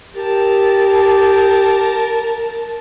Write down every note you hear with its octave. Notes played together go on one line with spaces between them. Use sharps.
G4 A#4 A5